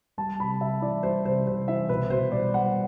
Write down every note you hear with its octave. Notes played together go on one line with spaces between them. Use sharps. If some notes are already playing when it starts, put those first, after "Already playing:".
G3 A5
C3 B5
C3 E5
E3 D5
G3 C5
C3 C5
C3 C5
E3 E5
B2 B4
B2 C5
G3 D5
G3 F#5